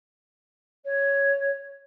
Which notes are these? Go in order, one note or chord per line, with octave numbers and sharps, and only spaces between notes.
C#5